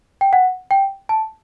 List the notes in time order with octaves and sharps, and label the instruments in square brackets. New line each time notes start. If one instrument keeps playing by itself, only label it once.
[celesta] G5
F#5
G5
A5